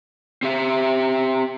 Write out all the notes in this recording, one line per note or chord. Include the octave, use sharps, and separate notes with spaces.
C4 G4 E5